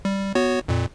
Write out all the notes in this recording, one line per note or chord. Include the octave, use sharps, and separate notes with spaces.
G3
B3 F#4 C#5
F2 A#2